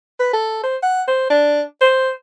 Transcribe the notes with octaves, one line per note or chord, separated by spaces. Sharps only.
B4
A4
C5
F#5
C5
D4
C5